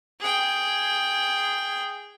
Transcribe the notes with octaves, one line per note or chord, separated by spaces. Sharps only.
G#4 G5